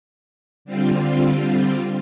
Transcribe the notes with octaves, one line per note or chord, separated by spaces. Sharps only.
D3 G3 C4 F4